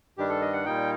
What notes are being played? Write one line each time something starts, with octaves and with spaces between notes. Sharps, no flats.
G2 D#3 G3 D4 G4
A4
D#5
F#5
A#2 G3 A#3 D#4 G5